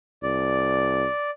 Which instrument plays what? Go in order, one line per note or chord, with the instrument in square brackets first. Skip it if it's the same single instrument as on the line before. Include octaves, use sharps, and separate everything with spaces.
[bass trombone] C2 [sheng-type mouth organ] D5